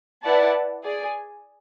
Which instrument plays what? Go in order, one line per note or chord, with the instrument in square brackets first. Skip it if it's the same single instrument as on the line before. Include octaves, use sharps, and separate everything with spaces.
[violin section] E4 B4 D5 F#5 A5
G#4 D5 G#5